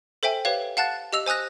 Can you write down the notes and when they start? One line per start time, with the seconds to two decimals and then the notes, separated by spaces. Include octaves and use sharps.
0.23 A4 C5 E5 G5 G#5
0.45 G4 B4 C#5 F5
0.77 F5 F#5 A5 F#6 A6
1.13 G4 D#5 E6 F7
1.26 C5 G#5 D#6 F#6 A#6